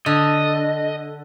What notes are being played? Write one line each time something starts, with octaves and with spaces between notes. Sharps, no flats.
D3 D#5